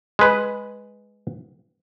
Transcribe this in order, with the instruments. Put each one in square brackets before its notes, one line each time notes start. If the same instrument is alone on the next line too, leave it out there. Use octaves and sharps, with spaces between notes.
[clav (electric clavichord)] G#3 B4